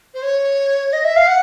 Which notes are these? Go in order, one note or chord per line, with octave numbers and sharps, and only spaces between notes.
C5
C#5
D#5
E5
F5
F#5